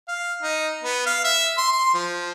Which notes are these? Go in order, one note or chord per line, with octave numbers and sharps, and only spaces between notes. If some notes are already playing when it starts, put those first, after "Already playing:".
F5
D#4
B3
F5
E5
C6
C6
F3